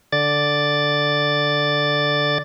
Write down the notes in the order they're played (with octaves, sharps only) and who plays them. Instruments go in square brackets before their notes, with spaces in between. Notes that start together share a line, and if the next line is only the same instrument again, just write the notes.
[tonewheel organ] D3 D5 A6